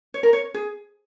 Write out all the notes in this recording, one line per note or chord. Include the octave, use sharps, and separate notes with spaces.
C#5
A#4
C#5
G#4